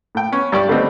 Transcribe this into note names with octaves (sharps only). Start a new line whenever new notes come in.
A2 G5
B3 C#4
G2 G4 D5 C#6
D3 G3 A3 B3 C4 D#4